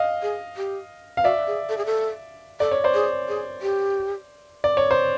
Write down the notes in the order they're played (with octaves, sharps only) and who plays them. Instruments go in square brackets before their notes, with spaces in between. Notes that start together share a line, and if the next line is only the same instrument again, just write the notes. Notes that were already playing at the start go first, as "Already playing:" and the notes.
Already playing: [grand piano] D#5 F5
[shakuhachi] G#4
G4
[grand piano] F5
[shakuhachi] F#4 [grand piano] D5 E5
[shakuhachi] G#4
A4
G#4
A4
[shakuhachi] A4 [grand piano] D5
[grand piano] C#5
C5 D5
[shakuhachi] G#4
G#4
G4
[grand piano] D5
C#5
C5